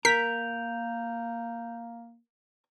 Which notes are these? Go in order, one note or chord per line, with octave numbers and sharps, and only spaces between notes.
A#3 A#4 G6 B6 F7